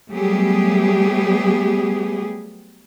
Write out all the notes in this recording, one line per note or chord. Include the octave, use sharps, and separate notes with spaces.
F#3 G3 A3 B3 G4 G#4